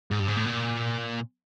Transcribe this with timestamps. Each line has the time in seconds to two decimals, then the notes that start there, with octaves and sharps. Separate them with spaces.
0.11 G#2
0.20 G2
0.28 G#2
0.37 A2
0.46 A#2